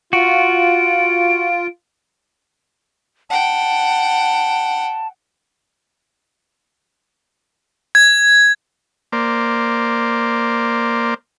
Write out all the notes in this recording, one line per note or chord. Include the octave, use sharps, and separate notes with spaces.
F4 F#4 D7
F#5 G5 A5
G#6
A#3 C5 D5